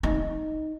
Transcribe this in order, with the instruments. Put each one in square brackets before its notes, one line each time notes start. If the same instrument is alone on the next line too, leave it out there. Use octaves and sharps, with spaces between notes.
[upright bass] D#4